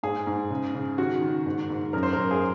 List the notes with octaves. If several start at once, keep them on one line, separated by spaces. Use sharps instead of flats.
G#2 G#4
G#2
C#3
C#3
D#3 F#4
D#3
G#2
G#2
F#2 A#4
C5
F#2 A#4
G#4